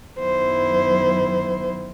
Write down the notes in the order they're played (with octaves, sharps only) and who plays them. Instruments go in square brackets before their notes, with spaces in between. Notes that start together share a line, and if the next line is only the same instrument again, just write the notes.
[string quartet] F#2 D#3 F#3 B3 E4 C5